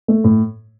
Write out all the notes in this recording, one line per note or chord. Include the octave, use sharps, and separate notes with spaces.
A3
A2